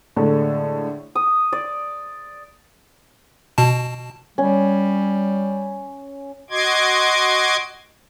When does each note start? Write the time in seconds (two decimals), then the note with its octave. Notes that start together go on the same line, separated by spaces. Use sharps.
0.17 A2 D3 G#3 A4
1.15 D#6
1.53 D5
3.58 B2 A5
4.38 G3 C#4
6.50 F#4 D#5 C6 D6 G#6